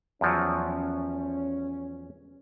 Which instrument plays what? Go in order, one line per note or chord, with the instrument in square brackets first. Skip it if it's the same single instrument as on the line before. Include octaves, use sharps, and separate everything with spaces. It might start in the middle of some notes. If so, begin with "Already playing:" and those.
[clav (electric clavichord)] E2 F3 F#3 [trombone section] C#4